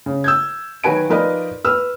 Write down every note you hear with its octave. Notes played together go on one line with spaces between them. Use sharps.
C#3
E6 G6 G#6
D#3 F#3 F#4 B4 G#5 D7
F3 D#4 A#4 B4 D5 D#5
B4 E6 F6